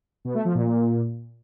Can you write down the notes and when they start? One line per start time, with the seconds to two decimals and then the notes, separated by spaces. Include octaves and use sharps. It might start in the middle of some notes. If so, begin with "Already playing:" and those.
0.25 B2
0.35 A3
0.45 F3
0.55 A#2